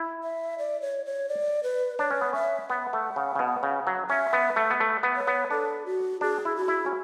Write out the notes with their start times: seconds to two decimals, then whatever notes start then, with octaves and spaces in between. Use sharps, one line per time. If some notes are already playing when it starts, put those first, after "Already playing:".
Already playing: E4
0.23 E5
0.59 D5
0.82 C#5
1.06 C#5
1.29 D5
1.63 B4
1.99 D4 C#5
2.11 C#4
2.21 B3
2.33 C#4 E5
2.69 B3 F#5
2.93 A3
3.16 C#3
3.35 C#3
3.39 B2
3.63 C#3
3.87 F#3
4.10 C#4 E5
4.33 B3
4.56 A3
4.70 B3
4.80 A3
5.03 B3
5.16 C#5
5.27 B3
5.51 D4 A4
5.86 F#4
6.21 D4 G#4
6.45 E4
6.56 F#4
6.68 E4
6.86 C#4